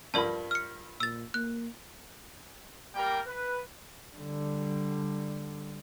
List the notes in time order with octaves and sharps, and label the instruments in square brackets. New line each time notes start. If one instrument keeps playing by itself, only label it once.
[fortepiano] G2 F3 B5 [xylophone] A#4 D5 A5
[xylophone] F6 C#7
[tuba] A#2 [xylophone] E6 A6
[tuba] A#3 [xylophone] F#6
[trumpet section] G3 A#3 G4 A#4 G5
B4
[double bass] D3 G3